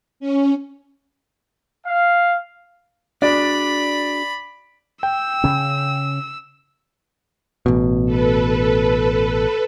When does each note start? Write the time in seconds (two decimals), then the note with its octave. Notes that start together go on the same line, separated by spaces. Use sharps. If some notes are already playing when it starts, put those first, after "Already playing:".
0.20 C#4
1.86 F5
3.22 D4 F#4 G#4 D5 B5
5.03 G5 E6
5.44 C#3 C#4
7.66 A1 B2
8.05 A4 B4